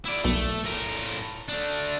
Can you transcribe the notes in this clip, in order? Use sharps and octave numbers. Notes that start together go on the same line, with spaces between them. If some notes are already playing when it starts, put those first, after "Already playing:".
E4 D5
B1 A3
A2 A#4
A3 D4